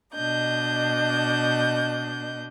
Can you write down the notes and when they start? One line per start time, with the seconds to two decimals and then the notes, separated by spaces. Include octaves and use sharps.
0.14 B2 D4 D#5 G6